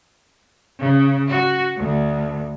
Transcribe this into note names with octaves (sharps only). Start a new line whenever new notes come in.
C#3
F#4
D2